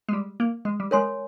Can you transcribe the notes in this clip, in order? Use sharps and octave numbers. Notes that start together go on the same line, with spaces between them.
G#3
G3
A#3
G#3
G3
G#3 A#4 C#5 G#5 C6